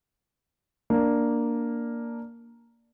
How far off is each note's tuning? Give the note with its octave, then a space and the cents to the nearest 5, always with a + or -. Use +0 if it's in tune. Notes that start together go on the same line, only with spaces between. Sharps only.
A#3 +0 D4 +0